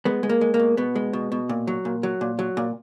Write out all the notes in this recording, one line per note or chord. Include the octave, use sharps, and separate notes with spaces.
G#3 B3
G#3
A#3
G#3
A#3
B2
B2 B3
G#3
B2
B2
A#2
F#3
A#2
F#3
A#2
F#3
A#2